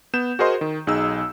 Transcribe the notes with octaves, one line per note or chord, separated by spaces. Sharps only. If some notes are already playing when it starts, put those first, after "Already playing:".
B3 G6 E7
F#4 G#4 A#4 C5 D#5 C6
D#3
B1 D#4 G#4 E6